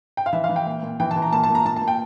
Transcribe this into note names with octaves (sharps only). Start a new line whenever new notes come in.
G5
F5
E3 E5
F5
E3
G5
A#2
A#2
E3 G5
A5
E3
A#5
A#2 A5
A5
A#2
A#5
A#2 A5
A5
A#2
G5